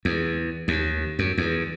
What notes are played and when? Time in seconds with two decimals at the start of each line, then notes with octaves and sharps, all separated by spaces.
0.05 E2
0.68 D#2
1.19 F#2
1.38 E2